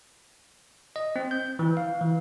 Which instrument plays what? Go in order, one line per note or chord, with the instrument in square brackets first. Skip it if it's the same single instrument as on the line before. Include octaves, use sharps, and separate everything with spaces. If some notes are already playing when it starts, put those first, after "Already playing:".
[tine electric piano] D#5
C4
G6
E3
F5
E3